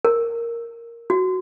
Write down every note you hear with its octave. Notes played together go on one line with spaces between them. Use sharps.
A#4
F#4